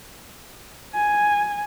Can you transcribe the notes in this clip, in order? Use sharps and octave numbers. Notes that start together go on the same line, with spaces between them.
G#5